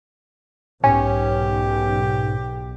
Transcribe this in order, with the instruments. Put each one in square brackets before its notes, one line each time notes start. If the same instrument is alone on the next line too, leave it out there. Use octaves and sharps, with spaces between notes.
[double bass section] B1 [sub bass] G#2 [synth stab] C#4 [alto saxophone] G4